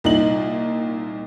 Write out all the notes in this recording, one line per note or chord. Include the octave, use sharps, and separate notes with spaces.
C2 A#2 D#4 F#7